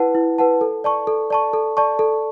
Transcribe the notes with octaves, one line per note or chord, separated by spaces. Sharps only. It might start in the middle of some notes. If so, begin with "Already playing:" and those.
Already playing: E4 B4 F#5 A5
E4
B4 F#5 A5
A4
D5 A5 C#6
A4
D5 A5 C#6
A4
D5 A5 C#6
A4